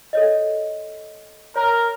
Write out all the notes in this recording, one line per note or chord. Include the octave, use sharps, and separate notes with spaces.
A4 C#5 D#5
A#4 C#5